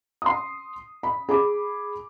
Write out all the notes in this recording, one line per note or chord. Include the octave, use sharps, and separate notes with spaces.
C6 D#6
B5
G#4 B5 D6